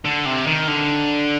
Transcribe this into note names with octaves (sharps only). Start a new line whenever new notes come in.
D3
C3
D#3
D3